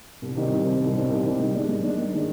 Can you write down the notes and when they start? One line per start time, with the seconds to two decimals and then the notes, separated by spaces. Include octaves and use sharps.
0.22 C2
0.36 C3 D#3 G3 C4
0.50 C2
0.65 C3 D#3 G3 C4
0.80 C2
0.95 C3 D#3 G3 C4
1.10 C2
1.25 C3 D#3 G3 C4
1.39 G#2
1.54 D#3 G#3 D4
1.68 G#2
1.83 D#3 G#3 D4
1.98 G#2
2.13 D#3 G#3 D4